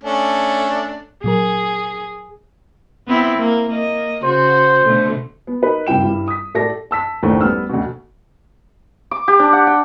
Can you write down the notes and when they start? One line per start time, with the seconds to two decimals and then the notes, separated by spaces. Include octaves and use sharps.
0.03 A3 C#4 D4
1.24 A#2 F#3 G#4 A#4
3.07 B3 C4 E4
3.38 A#3
3.70 A#3 D#5
4.24 C#3 F#4 C5
4.85 B2 D3 A3
5.47 B3
5.62 D#4 A#4 B4 B5
5.87 F#1 G2 E4 G5 E7
6.02 G2 G3 E4
6.28 D#6 B6
6.55 A2 A3 G4 A4 D5 A#6
6.91 A5 E6 B6
7.23 F1 D#2 A2 D3 A3 C5
7.40 G3 B3 E6 F6
7.69 D2 B2
9.11 D6
9.28 G4
9.39 D4
9.53 F#5
9.67 G5